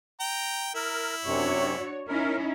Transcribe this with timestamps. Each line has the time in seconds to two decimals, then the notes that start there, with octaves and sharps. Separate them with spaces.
0.20 G5 A#5
0.75 E4 A#4
1.26 F#2 C3 D4 F#4 C#5
2.08 C#4 D#4 E4 A#4